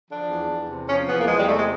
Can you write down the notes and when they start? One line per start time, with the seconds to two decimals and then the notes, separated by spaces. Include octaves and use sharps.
0.10 F3 D4
0.29 E2
0.49 E2
0.68 C3
0.88 F3 C#4
1.08 E2 B3
1.18 A#3
1.28 E2 G#3
1.38 G3
1.47 C3 A3
1.57 G#3